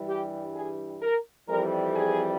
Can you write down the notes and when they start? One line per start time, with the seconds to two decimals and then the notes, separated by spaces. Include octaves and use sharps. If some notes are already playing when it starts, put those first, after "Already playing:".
Already playing: G2 E3 G3
0.08 G4
0.54 G#4
1.02 A#4
1.48 F2 E3 G3 A#4
1.95 G#4